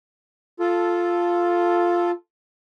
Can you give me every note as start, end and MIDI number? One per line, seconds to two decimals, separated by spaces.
0.60 2.11 65
0.60 2.11 69